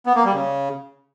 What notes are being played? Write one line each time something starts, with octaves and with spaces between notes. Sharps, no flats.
B3
A#3
G3
C#3